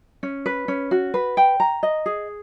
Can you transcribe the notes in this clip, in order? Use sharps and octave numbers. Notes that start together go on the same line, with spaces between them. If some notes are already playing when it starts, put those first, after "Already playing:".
C#4
B4
C#4
F#4
B4
G5
A#5
D#5
G#4